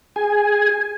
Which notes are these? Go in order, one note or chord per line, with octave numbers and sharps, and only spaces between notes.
G#4 G#5